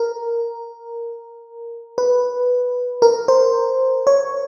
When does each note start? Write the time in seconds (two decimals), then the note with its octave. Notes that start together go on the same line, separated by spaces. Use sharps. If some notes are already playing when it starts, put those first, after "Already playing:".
Already playing: A#4
1.98 B4
3.02 A#4
3.28 C5
4.07 C#5